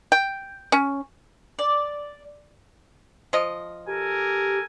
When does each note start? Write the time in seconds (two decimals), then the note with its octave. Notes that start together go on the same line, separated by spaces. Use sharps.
0.12 G5
0.72 C#4
1.59 D5
3.33 F3 D#5
3.87 G4 A4 A#4 G#5